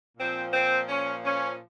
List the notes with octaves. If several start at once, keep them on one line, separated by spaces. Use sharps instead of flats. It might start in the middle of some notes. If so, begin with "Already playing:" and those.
A#2 F3 C4
C4
C#4
C#4